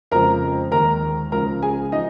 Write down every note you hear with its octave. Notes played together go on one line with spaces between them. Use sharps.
F2 C#3 F3 G#3 A#4 A#5
D#2 D#3 G#3 A#4 A#5
C#2 C#3 F3 G#3 A#4 A#5
G#4 G#5
F3 D#4 D#5